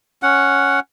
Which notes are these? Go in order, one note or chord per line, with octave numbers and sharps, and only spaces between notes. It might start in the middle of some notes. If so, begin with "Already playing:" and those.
C#4 F#5